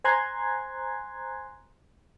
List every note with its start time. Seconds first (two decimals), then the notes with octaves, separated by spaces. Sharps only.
0.04 C5 G#5 A#5 C6 F#6 G#6